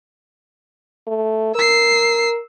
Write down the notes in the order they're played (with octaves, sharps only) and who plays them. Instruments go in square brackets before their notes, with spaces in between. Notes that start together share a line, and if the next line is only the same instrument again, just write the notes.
[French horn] A3
[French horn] A#4 [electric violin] E6 C7